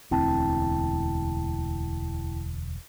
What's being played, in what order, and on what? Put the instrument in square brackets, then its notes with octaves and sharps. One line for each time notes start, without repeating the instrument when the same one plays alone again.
[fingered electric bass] E1 D2 C4 [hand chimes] E4 G5 A5